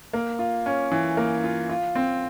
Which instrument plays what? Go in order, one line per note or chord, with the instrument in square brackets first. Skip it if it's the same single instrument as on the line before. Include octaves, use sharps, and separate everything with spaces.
[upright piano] A#3
F4
C#4
E3
A#3
F4
F4
C4